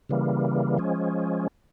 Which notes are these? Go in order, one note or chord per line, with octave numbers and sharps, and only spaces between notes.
C#3 E3 G3 A#3
F3 G#3 C#4